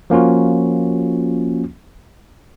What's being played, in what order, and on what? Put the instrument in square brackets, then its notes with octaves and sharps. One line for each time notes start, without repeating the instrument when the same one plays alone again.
[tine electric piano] F3 A#3 C#4 F4 F#4